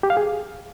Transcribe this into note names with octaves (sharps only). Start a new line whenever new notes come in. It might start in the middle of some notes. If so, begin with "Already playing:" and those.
G4
F5
G#4